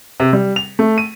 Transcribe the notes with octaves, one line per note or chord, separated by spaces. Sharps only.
C3
G3
F7
A3
D#7